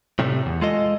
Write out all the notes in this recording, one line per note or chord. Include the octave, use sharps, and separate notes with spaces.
A2 C3 G3 A3
E2
G#3 F4 A4 D#5